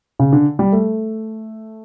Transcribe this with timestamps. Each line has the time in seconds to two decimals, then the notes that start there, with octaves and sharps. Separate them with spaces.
0.19 C#3
0.33 D3
0.59 G3
0.72 A3